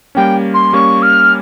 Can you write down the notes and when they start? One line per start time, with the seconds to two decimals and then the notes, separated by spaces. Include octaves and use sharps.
0.15 G3 A#3 C#4 G5
0.54 C6
0.73 G3 A#3 C#4 C#6
1.02 F6